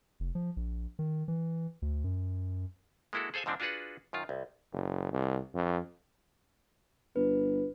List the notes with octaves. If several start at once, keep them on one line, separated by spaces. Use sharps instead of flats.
F1
F3
A#1
D#3
E3
D2
F#2
G#3 A#3 E4 F#4 A4
G#4 A4 C5 F5 G#5
G#2 D3 F3 C4 D4
D4 F4 F#4 G#4 B4 F#5
F#2 D#3 F4
C2
F#1
C2
F2
G1 B4